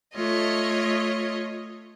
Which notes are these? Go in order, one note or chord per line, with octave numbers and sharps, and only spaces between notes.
A3 F4 C#5 D#5